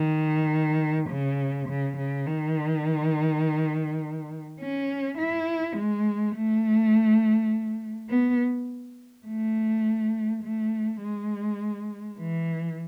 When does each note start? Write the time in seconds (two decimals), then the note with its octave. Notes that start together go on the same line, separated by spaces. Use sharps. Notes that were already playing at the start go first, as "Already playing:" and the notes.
Already playing: D#3
1.10 C#3
1.68 C#3
1.97 C#3
2.27 D#3
4.60 C#4
5.18 E4
5.76 G#3
6.35 A3
8.10 B3
9.27 A3
10.44 A3
11.02 G#3
12.19 E3